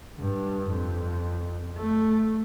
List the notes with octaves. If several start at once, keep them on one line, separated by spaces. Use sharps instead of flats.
G2
F2
A3